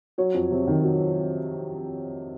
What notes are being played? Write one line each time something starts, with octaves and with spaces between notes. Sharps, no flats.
F#3 C#5
F2
C3
D#3
F#3